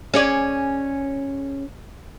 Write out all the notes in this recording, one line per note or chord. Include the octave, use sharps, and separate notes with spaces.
C#4 G#4 D5